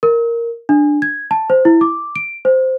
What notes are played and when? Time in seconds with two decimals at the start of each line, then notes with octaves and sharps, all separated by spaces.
0.03 A#4
0.69 D4
1.02 G#6
1.31 A5
1.50 C5
1.65 E4
1.81 D6
2.16 D7
2.45 C5